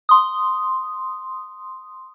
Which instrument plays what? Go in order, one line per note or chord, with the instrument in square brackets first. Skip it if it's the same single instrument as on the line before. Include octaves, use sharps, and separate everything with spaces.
[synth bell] C6 D#6